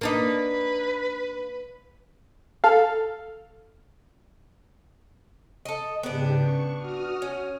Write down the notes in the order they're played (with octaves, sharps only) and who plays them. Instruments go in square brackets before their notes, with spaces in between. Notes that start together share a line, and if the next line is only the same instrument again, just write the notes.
[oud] A#3 D4 D#4 [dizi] B4
[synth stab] A4 F5
[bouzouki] A4 D#5
[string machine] G#2 C#3 G4 [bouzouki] B3 D4
[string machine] C#6
F#4 D#6 F6
[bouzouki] C#4